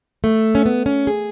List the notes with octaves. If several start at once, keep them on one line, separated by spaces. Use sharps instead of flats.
A3
C#4
B3
C#4
G#4